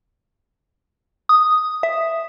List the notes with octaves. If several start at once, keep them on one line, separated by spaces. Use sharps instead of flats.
D#6
E5